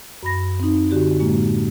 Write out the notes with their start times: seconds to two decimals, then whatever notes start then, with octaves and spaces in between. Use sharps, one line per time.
0.23 F#2 B5 A#6
0.60 C4 D#4
0.91 D3 F#4 G4
1.20 A2 G#3 A#3